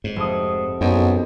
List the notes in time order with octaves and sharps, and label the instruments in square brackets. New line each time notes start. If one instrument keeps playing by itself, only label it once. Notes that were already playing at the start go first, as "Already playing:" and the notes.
[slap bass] G#2
[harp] F1 D#6
[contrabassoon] B1 [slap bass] F#2